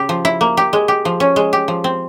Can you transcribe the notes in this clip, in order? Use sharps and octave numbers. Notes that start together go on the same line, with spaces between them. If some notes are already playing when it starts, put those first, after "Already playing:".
Already playing: C#3 G4
F3
E4
A#3
G4
G#3
G4
F3
C#4
G#3
G4
F3
C4